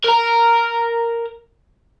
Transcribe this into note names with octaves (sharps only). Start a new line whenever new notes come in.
A#4 A#5